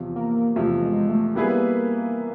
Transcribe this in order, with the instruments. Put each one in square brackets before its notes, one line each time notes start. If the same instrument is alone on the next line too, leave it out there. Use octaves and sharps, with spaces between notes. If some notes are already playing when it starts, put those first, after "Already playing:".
Already playing: [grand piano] E2 C3 F3
[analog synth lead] A#3
[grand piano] E2 C3 F3 [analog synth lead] A3
[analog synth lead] G#3
A3
[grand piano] G3 B3 E4 G#4 B4 [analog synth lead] A#3